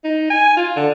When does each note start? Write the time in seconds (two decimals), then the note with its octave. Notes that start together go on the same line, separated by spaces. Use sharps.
0.04 D#4
0.30 G#5
0.57 F4
0.76 D3